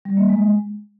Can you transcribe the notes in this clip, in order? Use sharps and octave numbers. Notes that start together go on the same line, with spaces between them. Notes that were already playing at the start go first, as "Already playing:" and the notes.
G3
A#3
G#3